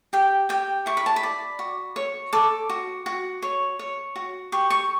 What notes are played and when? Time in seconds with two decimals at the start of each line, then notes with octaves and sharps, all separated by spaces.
0.13 G4 G5
0.49 G4 G5
0.86 E4 C#6
0.97 B5
1.06 A5
1.16 B5
1.23 D5
1.59 F#4
1.96 C#5
2.33 A4 D6
2.69 F#4
3.06 F#4
3.42 C#5
3.79 C#5
4.16 F#4
4.52 G4 C#6
4.70 C#6